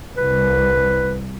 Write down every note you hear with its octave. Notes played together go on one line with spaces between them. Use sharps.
C2 B4